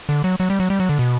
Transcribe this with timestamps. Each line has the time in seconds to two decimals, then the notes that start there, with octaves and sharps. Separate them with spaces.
0.09 D3
0.24 F#3
0.40 F#3
0.50 G3
0.60 F#3
0.70 G3
0.80 F#3
0.89 D3
0.99 B2